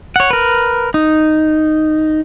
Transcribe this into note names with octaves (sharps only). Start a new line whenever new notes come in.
C#5 F#5
A#4 B4
D#4